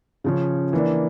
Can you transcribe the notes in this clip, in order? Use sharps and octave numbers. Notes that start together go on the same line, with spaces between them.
C#3 F3 C#4
E3 A#3 D4